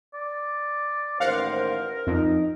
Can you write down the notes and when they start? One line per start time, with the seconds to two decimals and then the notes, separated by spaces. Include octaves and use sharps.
0.14 D5
1.20 A1 D#2 A#4 C5 F5 F#5
2.07 F2 D#4